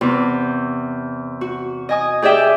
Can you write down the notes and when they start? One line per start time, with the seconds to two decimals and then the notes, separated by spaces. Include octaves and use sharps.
0.01 E2 C3
1.41 F#4
1.89 D#5 G#5 D#6
2.22 G4 G#4 D5 E5 G5